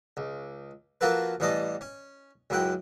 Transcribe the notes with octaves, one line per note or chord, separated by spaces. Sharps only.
C#2
F3 A#3 F4 F#4 A4 B4
A1 E3 G3 D#5 A5 D#6
C#4
C#2 F#2 E4 F#5 G5